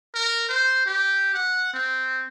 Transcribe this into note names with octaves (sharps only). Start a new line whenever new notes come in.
A#4
C5
G4
F#5
C4